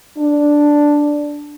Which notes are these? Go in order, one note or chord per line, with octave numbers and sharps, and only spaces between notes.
D4